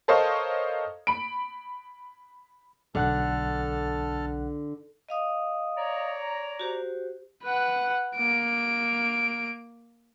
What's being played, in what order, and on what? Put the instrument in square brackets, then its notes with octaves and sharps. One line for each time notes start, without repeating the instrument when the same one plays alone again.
[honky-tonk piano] A4 A#4 C5 C#5 D#5 F5
B5 D7
[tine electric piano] B1 F#5 F#6 [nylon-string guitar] D3 [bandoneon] A4 A5 F6
[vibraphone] D#5 F5 D#6
[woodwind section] C#5 D5 A#5
[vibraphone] F#4 G4 C5
[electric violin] B4 F#5
A#3 D7